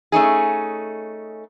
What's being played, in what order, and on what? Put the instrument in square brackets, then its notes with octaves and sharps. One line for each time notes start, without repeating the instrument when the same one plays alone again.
[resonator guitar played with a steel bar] A3 C#4 D#4 G#4